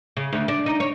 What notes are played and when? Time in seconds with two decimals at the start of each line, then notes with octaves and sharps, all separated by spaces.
0.17 C#3
0.33 D2
0.48 D4
0.66 D#4
0.80 C#5